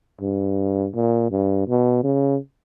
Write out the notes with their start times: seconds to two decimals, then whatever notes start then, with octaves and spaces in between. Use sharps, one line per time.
0.21 G2
0.94 A#2
1.31 G2
1.68 B2
2.04 C#3